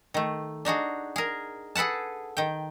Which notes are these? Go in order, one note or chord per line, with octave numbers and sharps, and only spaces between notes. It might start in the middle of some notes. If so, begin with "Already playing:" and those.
D#3 A3
D4 D#4 F#4 G#4
G#4 A#4
G#4 A4 B4 F#5 A5
D#3 G5